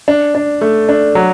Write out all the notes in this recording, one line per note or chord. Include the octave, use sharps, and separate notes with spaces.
D4
D4
A3
D4
F#3